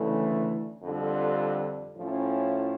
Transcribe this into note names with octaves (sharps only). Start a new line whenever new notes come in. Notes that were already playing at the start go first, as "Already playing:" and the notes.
Already playing: D2 C#3 E3 A3
F2 D3 G3 D4 F4
A2 F3 C#4 E4